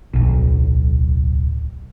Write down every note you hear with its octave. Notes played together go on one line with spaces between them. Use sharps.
D1 B1